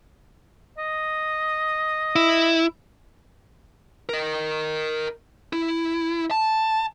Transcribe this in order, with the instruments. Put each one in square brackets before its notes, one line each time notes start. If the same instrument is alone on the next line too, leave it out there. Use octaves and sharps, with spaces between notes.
[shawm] D#5
[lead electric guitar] E4
A#4 D#5
E4
A5